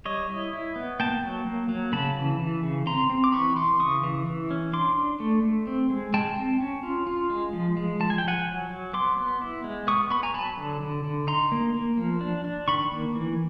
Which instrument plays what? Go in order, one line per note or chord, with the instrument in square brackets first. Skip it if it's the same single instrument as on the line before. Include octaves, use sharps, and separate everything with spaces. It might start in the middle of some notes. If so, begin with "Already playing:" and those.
[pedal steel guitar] G3 C#5 D#5
E4
E4
B3
A#3 G5 A5
F#3
A#3
F#3
C#3 A5 B5
E3
E3
C#3
C4 A#5 C6
C4
D6
E3 B5 C#6
E3 C6 D6
C#3 C#6 D#6
E3
E3
C#4
D4 C6 D6
D4
A3
A3
C4
G#3
G#3 G5 A5
C4
C#4
F4
F4
G#3
F3
G#3
F3 A5
G#5
G5
F3 F#5 G#5
F#3
F#3
B3 C6 D6
B3
E4
G#3
B3 C#6 D#6
B3 B5 C#6
G#5 A#5
F#3 A5 B5
D3
D3
D3
D#4 A#5 C6
A#3
A#3
F3
D4
D4
D#3 B5 C#6
A#3
E3